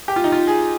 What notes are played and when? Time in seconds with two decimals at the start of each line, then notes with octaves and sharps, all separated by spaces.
0.08 G4
0.16 F4
0.24 D#4
0.32 F4
0.47 G#4